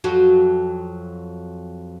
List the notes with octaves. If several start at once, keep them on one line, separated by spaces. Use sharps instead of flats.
F2 F#3 F#4